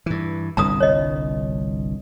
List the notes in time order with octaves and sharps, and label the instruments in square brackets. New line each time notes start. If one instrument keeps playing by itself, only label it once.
[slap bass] G2 E3
[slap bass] G1 C2 G2 [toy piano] A#5 D#6
[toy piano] C#5 D#5